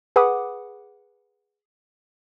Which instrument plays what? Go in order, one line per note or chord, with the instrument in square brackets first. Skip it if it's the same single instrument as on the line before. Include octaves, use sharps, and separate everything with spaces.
[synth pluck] G#4 B4 F#5 B5 D6 D#6